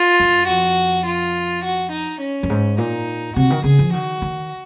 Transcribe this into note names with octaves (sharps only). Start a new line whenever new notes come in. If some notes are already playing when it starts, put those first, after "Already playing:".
Already playing: F4
F#2
F2 F#4
F4
F#4
D#4
C#4
F#2
G#2
A#2 D#4
C3 F#4
D#3
C#3 G#4
F3
D#3 F#4
D#3